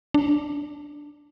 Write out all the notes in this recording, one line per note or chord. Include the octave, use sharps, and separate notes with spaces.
D4